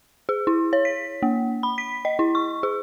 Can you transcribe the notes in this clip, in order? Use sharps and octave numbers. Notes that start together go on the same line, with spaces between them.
G#4
E4
C#5
B6
A#3
B5
B6
D#5
E4
C#6
G#4